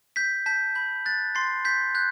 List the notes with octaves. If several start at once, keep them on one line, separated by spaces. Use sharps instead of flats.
G6 B6
A5 G6 B6
B5 G6
F#6 A6
C6 A6 C7
G6 B6
F#6 G6